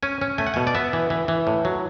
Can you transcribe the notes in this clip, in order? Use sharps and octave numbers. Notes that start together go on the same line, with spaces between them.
C#4 G#5
C#4
A3 G#5
F#5
B2 G#5
D5
B3 E5
E3
E3
E3
A2
F#3